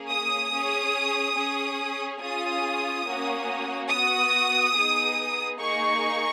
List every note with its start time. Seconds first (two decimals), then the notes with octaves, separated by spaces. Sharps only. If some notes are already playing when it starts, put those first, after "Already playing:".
Already playing: A#3 C#4 G#4
0.10 D#6
0.53 C#4 G#4
1.37 C#4 G#4
2.21 C#4 F4 G#4 D#6
3.07 A#3 C#4 F#4
3.90 B3 F#4 D#6
4.75 B3 D#4 G#4
5.60 A#3 D#4 G#4 C#6